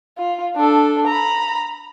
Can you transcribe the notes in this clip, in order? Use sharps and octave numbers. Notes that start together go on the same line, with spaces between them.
F4
D4 A4
A#5 B5